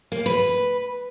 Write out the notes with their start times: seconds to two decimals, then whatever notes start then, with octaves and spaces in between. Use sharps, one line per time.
0.12 A#3
0.26 B4